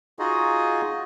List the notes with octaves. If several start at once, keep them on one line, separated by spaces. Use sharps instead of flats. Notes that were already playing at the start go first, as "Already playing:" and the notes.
D#4 F4 F#4 G#4 D#5